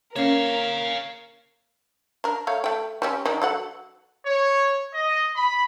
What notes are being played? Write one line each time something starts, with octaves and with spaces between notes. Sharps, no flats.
A#3 C#4 A#4 C#5 F5
D4 A#4
A3 C#5 F5
A3 G5
G3 C4 C#4
D#3 D4
F#3 A4 F#5
C#5
D#5
B5